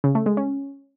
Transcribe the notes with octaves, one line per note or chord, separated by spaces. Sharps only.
C#3
A3
G#3
C#4